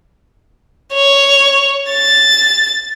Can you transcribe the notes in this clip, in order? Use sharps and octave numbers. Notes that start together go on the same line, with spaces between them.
C#5
A6